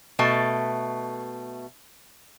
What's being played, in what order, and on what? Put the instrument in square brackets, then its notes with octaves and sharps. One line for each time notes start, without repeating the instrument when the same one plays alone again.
[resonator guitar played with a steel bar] B2 A3 A5